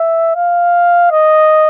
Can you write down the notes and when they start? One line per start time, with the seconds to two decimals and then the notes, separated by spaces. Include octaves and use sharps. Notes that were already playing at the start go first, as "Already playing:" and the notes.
Already playing: E5
0.36 F5
1.11 D#5